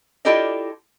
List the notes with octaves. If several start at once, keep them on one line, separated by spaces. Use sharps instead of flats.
E4 F4 G4 A4 D5 D#5